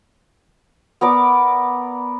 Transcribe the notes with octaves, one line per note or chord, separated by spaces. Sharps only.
B3 A#4 D5 D6